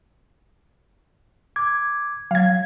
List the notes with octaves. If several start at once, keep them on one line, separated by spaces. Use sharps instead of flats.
D6 G#6
F#3 F5 G#6